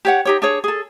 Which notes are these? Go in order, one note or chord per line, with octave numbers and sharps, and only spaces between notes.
G4 C#5 F#5
D#4 G4 C#5
D4 G#4 C#5
G#4 A4